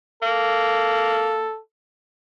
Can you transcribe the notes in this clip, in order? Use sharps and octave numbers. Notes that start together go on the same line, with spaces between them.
A#3 A4